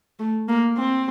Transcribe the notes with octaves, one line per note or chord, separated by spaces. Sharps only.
A3
A#3
C4